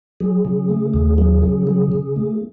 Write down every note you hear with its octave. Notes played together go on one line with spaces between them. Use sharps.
F#3 G#4
C#3
A3
D#2 G#4
F#3 G#4
C#3 G#4
F#3 G#4
C#3
A3